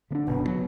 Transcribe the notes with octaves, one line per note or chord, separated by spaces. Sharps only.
D3 B3 D4
F#1 B2
D3
F#3